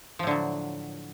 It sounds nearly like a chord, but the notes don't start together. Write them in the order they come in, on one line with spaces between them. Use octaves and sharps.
F3 A2 D3 F#3